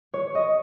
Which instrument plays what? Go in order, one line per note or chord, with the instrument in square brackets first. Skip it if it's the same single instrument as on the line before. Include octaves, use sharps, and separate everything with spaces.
[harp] C#5
D#5